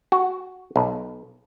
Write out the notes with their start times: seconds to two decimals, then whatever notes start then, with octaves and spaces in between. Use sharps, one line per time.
0.12 F#4
0.76 B1